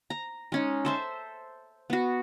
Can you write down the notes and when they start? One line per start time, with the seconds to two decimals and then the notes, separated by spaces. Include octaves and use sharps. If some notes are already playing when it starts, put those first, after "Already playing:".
0.10 A#5
0.52 G#3 C#4 D#4
0.85 A4 C5 E5
1.90 B3 F#4